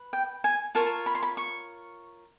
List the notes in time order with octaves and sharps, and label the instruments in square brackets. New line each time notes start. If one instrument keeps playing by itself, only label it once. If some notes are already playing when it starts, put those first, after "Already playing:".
Already playing: [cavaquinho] B4
G5
G#5
F4 A#4 C#5 A5
B5
C6
B5
C#6